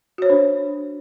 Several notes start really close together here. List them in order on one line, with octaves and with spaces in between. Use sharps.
F#4 C#5 C5 D4